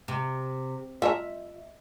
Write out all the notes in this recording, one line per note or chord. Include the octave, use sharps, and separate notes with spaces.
C3
F4 E5 A5 A#5